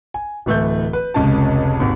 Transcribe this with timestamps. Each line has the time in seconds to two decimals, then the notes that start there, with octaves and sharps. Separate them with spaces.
0.14 G#5
0.46 D1 E3 A3 A4 G6
0.93 B4
1.14 F1 C#2 C#4 C#5 A5
1.80 G#1 D#2